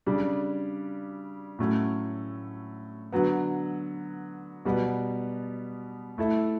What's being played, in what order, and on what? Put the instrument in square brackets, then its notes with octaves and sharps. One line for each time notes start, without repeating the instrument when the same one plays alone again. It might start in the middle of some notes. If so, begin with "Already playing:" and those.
[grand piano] C#3 G3 D4
A2 F#3 A3 C#4
D3 F#3 B3
B2 G3 B3
A3 E4 A4 E5